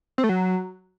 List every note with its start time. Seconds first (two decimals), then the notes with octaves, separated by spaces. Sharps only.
0.18 C4
0.24 A3
0.29 F#3